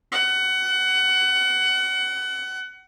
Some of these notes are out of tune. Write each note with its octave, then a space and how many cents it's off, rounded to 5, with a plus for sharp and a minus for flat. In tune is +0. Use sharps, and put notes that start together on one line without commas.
F#5 +25